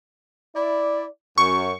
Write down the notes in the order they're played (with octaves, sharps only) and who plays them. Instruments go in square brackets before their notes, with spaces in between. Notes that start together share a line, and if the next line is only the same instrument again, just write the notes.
[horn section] E4 D5
[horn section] F#2 [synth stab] C#6